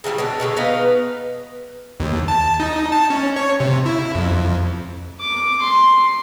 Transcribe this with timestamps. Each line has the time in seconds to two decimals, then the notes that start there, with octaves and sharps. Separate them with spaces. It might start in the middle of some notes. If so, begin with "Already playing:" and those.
0.04 C#3 E3 F#3 G3
0.18 B2 D3 D4
0.40 B2 D3 G#3 A3
0.56 B3 D#4 B4 F5
2.00 D#2
2.28 A5
2.60 D#4
2.92 A5
3.10 C#4
3.36 C#5
3.60 C3
3.86 E4
4.15 F2
5.20 D6
5.62 C6